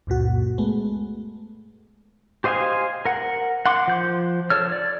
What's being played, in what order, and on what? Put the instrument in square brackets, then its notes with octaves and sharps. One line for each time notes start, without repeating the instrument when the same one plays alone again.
[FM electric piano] C#2 F#2 A#2 F#4
G#3 A3 B3
[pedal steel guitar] G4 C5 D#5 F5 G#5
A#4 F#5
F#5 C6 D6
F3 G6
A4 C#5 F6
D5